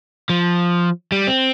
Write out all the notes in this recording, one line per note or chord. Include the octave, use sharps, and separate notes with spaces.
F3
G3
C4